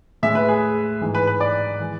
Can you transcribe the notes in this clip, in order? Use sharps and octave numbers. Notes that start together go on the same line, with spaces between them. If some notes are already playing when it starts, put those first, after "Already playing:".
A2 G#3 E5
B4
G#4
G#2 E3 G#3
B4
B4
D5
E3 G#3